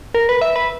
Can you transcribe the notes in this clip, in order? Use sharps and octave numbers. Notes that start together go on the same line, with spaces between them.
A#4
B4
E5
B4